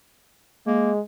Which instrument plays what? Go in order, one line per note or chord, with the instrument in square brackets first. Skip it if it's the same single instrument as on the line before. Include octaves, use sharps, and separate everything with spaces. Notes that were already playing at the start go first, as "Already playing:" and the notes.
[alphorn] G#3 [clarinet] A#3